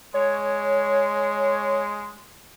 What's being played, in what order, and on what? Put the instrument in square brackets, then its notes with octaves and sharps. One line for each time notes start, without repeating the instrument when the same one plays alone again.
[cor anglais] G#3 [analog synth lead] C#5